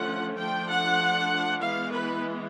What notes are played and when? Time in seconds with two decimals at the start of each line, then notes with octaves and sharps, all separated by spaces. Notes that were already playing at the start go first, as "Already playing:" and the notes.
Already playing: D3 F3 A3 C#4 F#5
0.37 F3 A3 D4 G5
0.68 F#5
1.62 E3 G#3 B3 F5
1.92 B4